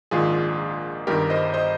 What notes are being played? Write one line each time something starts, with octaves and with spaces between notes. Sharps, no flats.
A#1 G#2 D#3 F4 G#4
G1 G2 D#3 G4 A#4
C5 D#5
C5 D#5